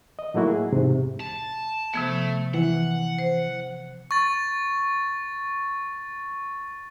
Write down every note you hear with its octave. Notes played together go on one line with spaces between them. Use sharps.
D#5
A2 F#3 A3 A#3 E4 F#4
G#4
E2 G#2 C3
A5
C3 F3 A3 B3
E3 F#5
C5
C#6 A6